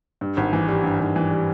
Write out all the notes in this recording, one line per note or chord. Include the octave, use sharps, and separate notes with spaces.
G2
G#1
E3
G3
G2
G#1
E3
G3